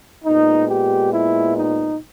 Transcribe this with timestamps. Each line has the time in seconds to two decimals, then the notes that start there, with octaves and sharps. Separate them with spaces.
0.24 A#2 G#3 B3 D#4
0.69 G4
1.13 E4
1.57 D#4